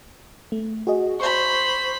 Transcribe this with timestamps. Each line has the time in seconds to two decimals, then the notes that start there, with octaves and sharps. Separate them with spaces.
0.52 A3
0.87 F#4 G#4 D#5
1.20 C5 B5 C#6